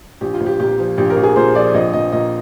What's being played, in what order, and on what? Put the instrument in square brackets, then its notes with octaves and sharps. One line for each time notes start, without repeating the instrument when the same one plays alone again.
[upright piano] A#1 G4
F4
A#1
G4
A#2 G4
F3
A#1 G4
A#4
A#1
G#4
A#2 C5
F3 D5
A#1 D#5
A#1 D#5
A#2 D#5